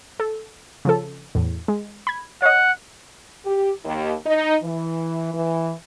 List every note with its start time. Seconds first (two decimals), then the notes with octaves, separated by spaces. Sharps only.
0.20 A4
0.85 C#3 F3 A4
1.35 E2 A2
1.68 G#3
2.07 B5 G#6
2.42 C#5 D#5 F#5
3.45 G4
3.84 D#2
4.26 D#4
4.63 E3
5.34 E3